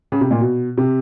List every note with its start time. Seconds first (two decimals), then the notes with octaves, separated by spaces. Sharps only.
0.12 C#3
0.21 C3
0.31 A#2
0.41 B2
0.77 C3